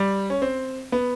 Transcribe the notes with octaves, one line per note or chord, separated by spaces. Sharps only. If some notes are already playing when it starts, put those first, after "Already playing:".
Already playing: G3
C#4
C4
B3